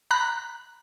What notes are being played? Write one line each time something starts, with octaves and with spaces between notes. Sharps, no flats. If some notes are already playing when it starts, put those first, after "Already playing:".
A#5 B5 F#6